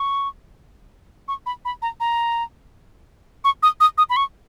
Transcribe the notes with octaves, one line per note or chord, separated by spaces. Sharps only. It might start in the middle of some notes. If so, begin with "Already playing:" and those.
Already playing: C#6
C#6
B5
B5
A#5
A#5
C#6
D#6
D#6
D#6
B5
C#6